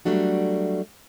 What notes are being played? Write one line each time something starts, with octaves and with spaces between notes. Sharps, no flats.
F#3 G3 A3 D4 F#4